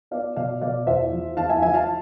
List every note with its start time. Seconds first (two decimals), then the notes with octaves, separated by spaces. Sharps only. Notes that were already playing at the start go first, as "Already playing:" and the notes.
0.11 B3 D5 F5
0.36 B2 D5 F5
0.61 B2 D5 F5
0.87 E2 C5 E5
1.12 F3
1.37 E2 F5 A5
1.49 E5 G#5
1.62 F3 E5 G#5
1.74 F5 A5